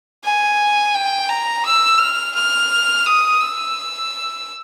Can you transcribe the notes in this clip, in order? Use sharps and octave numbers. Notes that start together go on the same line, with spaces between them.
G#5
G5
A#5
E6
F6
F6
D#6
E6